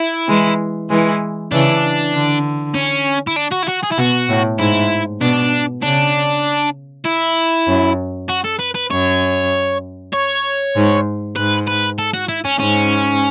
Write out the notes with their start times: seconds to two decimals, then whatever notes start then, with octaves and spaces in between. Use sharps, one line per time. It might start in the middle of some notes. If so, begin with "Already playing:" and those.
Already playing: E4
0.28 E3 G#3
0.90 E3 G#3
1.52 C#3 E3 D4
2.14 D3
2.75 C#4
3.27 E4
3.36 D4
3.51 F#4
3.63 E4
3.68 F#4
3.83 G#4
3.91 E4
3.98 B2 F#4
4.29 A2
4.59 G#2 E4
5.21 B2 D4
5.82 C#3 D4
7.05 E4
7.67 F#2
8.29 F#4
8.45 A4
8.60 B4
8.75 B4
8.91 F#2 C#5
10.13 C#5
10.76 G#2
11.36 G#2 B4
11.68 B4
11.99 A4
12.14 F#4
12.29 E4
12.45 C#4
12.60 G#2 C#4